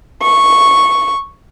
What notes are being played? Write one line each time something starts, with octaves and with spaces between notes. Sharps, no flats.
C#6